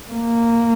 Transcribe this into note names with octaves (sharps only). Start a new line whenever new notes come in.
A#3